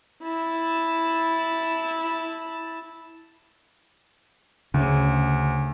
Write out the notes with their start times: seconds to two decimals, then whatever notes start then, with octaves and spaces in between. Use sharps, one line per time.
0.24 E4 A5
4.74 D2 C#3